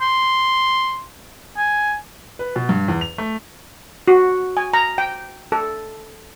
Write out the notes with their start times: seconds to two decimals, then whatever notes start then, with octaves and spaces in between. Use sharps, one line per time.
0.01 C6
1.57 G#5
2.39 B4
2.56 B2
2.69 G2
2.88 E2
3.01 F7
3.18 A3
4.08 F#4
4.57 G#5
4.73 A#5
4.98 G5
5.52 A4